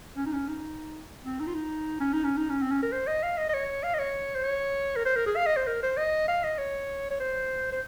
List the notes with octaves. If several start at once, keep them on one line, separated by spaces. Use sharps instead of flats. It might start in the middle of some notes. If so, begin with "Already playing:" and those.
C#4
D#4
C#4
D#4
C4
D#4
F4
D#4
C#4
D#4
C#4
D#4
C#4
C4
C#4
A#4
C5
D#5
F5
D#5
D#5
C#5
F5
D#5
C#5
C5
C#5
A#4
C5
A#4
G#4
F5
D#5
C5
A#4
C5
D#5
F5
D#5
C#5
C#5
C5
C5